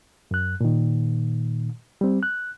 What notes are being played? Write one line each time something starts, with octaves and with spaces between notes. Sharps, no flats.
F#2 F#6
A#2 D#3
G3 C4
F#6